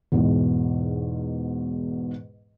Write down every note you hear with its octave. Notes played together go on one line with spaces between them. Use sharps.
E2 G#2 B2